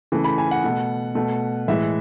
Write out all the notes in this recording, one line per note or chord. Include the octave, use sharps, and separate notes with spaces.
C#3 E3 A3
B5
G#5
F#5
B2 A3
B2 A3
A2 E3 G#3 E5